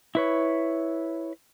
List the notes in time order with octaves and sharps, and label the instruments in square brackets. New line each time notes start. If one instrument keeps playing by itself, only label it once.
[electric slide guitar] E4 B4 C#5